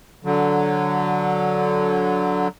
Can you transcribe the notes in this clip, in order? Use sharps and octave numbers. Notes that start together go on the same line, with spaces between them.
D3 F#3